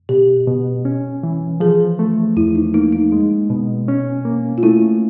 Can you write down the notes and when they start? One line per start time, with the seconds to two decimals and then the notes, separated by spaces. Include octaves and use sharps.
0.09 B2 G4
0.47 B2
0.85 C#4
1.23 E3
1.60 F3 G#4
1.99 A3
2.36 E2 E4
2.55 D#4
2.74 A#3 D#4
2.92 D#4
3.12 G#3
3.50 B2
3.88 C#4
4.25 A#3
4.58 F4
4.63 A3 E4